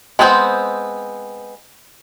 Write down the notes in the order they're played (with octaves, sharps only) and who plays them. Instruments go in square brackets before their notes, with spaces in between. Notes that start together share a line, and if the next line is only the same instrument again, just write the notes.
[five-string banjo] G#3 B3 C4 G#4 C5